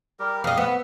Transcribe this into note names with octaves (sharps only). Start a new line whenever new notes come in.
G3 G4 A#4
F2 D#5 F5 D#6
B3 E6